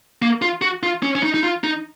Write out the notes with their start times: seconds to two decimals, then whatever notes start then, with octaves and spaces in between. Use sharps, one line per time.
0.22 A#3
0.42 F4
0.62 F#4
0.83 F4
1.03 C#4
1.15 C#4
1.23 D#4
1.34 D#4
1.43 F4
1.64 D#4